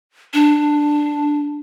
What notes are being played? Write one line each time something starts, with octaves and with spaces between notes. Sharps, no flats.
D4